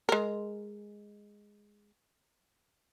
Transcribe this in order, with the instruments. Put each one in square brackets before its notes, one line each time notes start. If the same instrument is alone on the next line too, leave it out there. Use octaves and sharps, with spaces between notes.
[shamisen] G#3 A#4